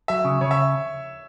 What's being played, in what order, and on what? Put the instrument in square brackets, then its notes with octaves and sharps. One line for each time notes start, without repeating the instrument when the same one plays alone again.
[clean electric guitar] F#3 [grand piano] E5
[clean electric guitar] C#3
[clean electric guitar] C#3 [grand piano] C#5
[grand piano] E5